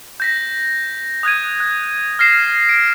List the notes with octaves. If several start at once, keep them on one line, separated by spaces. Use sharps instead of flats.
G6 A#6 B6
D#6 F#6 G#6 D#7
F#6
F6 A#6 C7 E7
D7